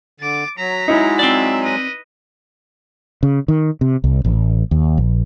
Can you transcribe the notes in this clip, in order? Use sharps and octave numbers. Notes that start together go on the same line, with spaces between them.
D3 D6 A6
F#3 A#5 B6
F#3 G#3 D#4 E4
C4 D5 E5
B4 D#5
C#3
D#3
C3
C2
A1
D#2
A#1